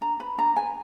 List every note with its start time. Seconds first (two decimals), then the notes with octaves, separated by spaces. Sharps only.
0.01 D4 A#5
0.20 B4 B5
0.38 D4 A#5
0.56 B4 G#5